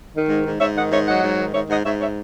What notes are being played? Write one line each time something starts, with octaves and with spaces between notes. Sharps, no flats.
D#3
G#2
G#2
G#2 C#5 E5
D#3 D#5 F#5
G#2 C#5 E5
F#3 D#5 F#5
G#2
D#3
G#2 C#5 E5
G#2 D#5 F#5
G#2 C#5 E5
C#5 E5